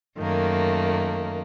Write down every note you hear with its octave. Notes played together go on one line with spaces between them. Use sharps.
F#2 D#3 A3 A#3